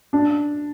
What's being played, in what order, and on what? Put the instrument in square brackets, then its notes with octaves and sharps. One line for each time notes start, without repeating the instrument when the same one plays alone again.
[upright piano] D4